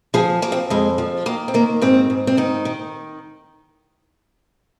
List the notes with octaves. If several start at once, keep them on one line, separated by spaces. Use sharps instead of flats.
F3 G#4
F3 A#3
C4
F2 G#3
F3
D#3 A#3
C4
D#3 A#3
G#2 C4
G#2
C4
D#3 D#4
D#3